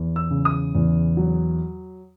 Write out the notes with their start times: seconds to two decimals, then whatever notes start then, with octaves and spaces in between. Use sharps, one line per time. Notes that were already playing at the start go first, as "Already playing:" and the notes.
Already playing: E2
0.16 E6
0.30 C#3
0.45 D#6
0.75 E2
1.17 F#3